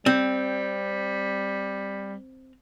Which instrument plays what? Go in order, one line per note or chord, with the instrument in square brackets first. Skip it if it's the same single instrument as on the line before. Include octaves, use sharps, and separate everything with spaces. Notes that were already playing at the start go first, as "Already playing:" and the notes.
[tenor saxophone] G3 [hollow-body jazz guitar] C4